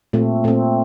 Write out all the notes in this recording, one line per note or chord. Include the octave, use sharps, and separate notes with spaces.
A#2 A3 C4
A#2 A3 C4